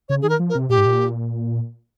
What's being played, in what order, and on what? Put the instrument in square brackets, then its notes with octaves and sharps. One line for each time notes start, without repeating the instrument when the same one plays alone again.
[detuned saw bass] C#3 [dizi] C#5
[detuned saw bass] D#3 [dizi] G#4
[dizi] A#4
[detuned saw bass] F3
[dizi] A#4
[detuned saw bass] C3
[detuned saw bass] A#2 [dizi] G4
[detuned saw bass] G#2
A#2